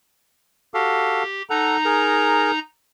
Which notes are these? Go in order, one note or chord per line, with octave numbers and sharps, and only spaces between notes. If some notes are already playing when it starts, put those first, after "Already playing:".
F#4 G4 A4 F5
D#4 A4 F#5 A#5
G#4 A#4